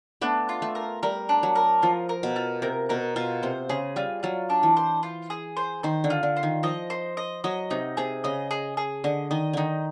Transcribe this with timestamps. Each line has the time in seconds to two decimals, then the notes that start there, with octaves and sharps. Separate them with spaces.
0.21 A3 B3 D4
0.49 F4
0.62 A3
0.75 A#4
1.03 G3 A#4
1.29 D4
1.43 F#3
1.56 A#4
1.82 F3 F4
2.09 A#4
2.23 B2
2.36 F4
2.62 C3 A#4
2.89 B2 A#4
3.16 B2 F4
3.43 C3 C5
3.69 C#3 G#4
3.96 G3 F4
4.23 F#3 F4
4.50 D4
4.63 E3
4.77 C5
5.03 F4
5.30 G#4
5.57 C5
5.83 D#3 C5
6.04 D3
6.10 F4
6.23 D3
6.37 C5
6.43 D#3
6.63 F3 D#5
6.90 C5
7.17 D#5
7.44 F#3 D#5
7.70 C3 D#4
7.97 C3 G#4
8.24 C#3 D#5
8.51 G#4
8.77 G#4
9.04 D3 D#5
9.31 D#3 D#5
9.53 D3 D#3 D#4